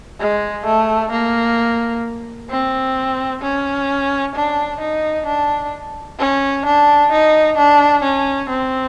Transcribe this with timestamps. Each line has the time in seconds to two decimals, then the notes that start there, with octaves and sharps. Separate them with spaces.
0.20 G#3
0.66 A3
1.12 A#3
2.50 C4
3.42 C#4
4.35 D4
4.81 D#4
5.27 D4
6.19 C#4
6.66 D4
7.12 D#4
7.58 D4
8.03 C#4
8.49 C4